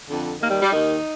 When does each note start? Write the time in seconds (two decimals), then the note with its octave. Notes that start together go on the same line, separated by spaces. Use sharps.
0.08 F2 D3
0.40 D#2 D#3 A#3
0.50 G3
0.62 G3
0.72 D#2 D#3 D#4